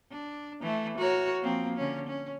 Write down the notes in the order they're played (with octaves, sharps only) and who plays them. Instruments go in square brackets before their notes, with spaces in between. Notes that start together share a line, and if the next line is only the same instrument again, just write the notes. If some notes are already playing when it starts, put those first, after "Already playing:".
[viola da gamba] D4
E3 A3
F#4 A#4 C#5
F3 A#3 C4
D3 C#4
C#4